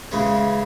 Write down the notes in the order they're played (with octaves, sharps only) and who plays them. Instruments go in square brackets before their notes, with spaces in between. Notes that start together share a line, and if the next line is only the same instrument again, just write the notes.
[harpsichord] C#3 E3 G#3 C#4